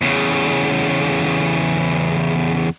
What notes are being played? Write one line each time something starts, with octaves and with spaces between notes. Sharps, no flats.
E2 C#3